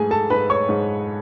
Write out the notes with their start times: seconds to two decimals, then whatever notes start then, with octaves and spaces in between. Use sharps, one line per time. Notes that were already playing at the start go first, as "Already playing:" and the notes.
Already playing: G#2 A3 G#4 G#5
0.11 A4 A5
0.30 G#2 B4 B5
0.50 C#5 C#6
0.69 G#2